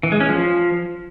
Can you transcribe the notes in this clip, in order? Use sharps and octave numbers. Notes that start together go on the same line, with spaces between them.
E3
G#3
C#4
F3